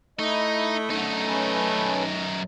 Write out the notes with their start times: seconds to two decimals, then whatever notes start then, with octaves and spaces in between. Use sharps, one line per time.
0.19 A3 D#4 E4 D#5
0.91 F#2 D3 A3 D#4
1.26 C#4 B4 A5